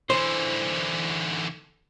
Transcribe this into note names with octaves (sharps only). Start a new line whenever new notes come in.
D3 E3 C5